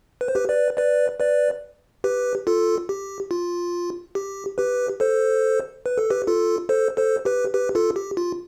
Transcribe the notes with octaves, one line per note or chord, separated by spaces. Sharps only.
B4
C5
G4 B4
B4 D5
B4 D5
B4 D5
G4 B4
F4 A4
G4
F4
G4
G4 B4
A4 C5
B4
A4
G4 B4
F4 A4
A4 C5
A4 C5
G4 B4
G4 B4
F4 A4
G4
F4